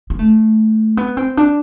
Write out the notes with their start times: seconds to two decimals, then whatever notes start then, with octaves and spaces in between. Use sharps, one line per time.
0.10 B3
0.19 A3
0.97 B3
1.17 C4
1.37 D4